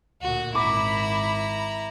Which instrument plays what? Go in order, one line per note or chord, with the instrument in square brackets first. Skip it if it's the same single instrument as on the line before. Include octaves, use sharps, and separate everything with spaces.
[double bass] D2 A#2 [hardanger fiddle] F#4
[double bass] G#1 [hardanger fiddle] E4 A#5 [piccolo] B5 [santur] D6